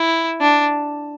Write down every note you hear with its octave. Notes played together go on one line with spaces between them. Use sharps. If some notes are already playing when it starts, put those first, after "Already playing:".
Already playing: E4
D4